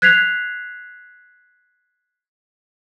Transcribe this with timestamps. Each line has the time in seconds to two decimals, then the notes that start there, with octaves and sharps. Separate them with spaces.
0.02 F#6 G#6 B6 C7 F7